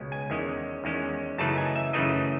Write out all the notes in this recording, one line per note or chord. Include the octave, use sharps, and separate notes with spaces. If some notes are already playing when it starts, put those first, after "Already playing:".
Already playing: C#2 B2 G#3 C#4
G#5
E2 D#3 G#3 C#4
E2 D#3 G#3 C#4
F#2 C#3 E3 A3 D#4 A5
G#5
E5
F#2 C#3 E3 A3 D#4 D#5